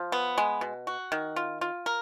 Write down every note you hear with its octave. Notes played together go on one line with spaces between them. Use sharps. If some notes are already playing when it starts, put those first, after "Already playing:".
Already playing: F3
B3
G#3
B2
F#4
D#3
F4
F4
A#4